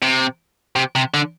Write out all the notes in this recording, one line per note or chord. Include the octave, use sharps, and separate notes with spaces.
C3
C3
C3
D3